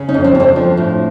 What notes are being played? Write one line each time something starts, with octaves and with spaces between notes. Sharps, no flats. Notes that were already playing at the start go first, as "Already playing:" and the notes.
Already playing: C#3
C#4 D#4
F2
C4 D4
F2 C4 C#4 D4
F3
A2